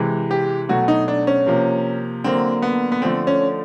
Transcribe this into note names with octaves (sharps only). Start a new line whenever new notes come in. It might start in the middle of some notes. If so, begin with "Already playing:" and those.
Already playing: C3 E3 G#3
G4
B2 F#3 A3 F#4
D#4
D4
C#4
C3 F3 A#3
D3 F#3 A#3 C4
B3
B3
D3 F3 A3 C4
C#4